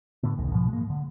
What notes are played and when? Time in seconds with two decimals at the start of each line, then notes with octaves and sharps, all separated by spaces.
0.23 A2 D3 B3
0.37 E1 C2 D#3 G#3
0.53 G#2 B2 F3
0.69 G#3 A#3
0.90 D3